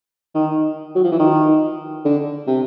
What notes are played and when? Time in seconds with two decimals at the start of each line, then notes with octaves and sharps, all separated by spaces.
0.35 D#3
0.95 F#3
1.04 F3
1.12 E3
1.19 D#3
2.05 D3
2.47 C3